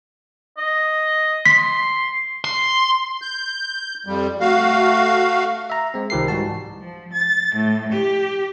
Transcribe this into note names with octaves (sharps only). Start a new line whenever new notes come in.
D#5
C6 B6
C6
G6
F2 G3
A3 F#4 F5
E5 A#5
G#3 C4
C2 D#3 F3 G4 A#4 C7
G#2 E3 G3 F#4 A5
F3
A6
A2
G4